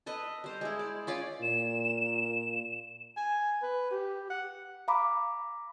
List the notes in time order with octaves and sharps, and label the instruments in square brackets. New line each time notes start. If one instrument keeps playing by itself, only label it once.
[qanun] A4 B4 D#5
G3 C5
G#3 E4
D5
C#4 F4 D5
[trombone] A#2 [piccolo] E7
[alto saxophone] G#5
B4
G4
F#5
[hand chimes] F5 A#5 B5 D6